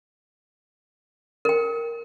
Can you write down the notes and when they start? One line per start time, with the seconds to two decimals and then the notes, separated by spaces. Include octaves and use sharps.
1.45 A#4 G5